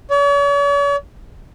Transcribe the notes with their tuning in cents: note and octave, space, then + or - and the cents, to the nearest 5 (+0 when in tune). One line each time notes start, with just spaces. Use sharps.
C#5 +45